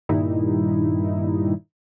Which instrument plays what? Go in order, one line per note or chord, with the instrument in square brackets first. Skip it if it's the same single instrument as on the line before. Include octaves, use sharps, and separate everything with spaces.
[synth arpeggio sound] G2 A#2 D#3 G3 D#4 E4